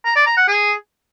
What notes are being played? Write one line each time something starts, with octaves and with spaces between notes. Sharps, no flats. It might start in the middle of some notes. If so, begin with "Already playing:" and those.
A#5
D5
A#5
F#5
G#4